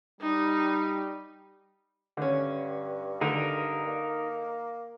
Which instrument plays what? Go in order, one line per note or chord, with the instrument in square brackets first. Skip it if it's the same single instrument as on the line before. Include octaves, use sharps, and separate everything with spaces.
[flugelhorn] G3 [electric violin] D#4
[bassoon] G2 [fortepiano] D3 C#4
[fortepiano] D3 [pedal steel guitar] D#4 A#4
[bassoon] A#3